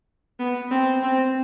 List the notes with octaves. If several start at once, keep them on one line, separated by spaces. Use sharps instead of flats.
B3
C4
C4